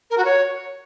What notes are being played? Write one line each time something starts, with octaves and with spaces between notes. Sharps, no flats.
A#4
F#4
C#5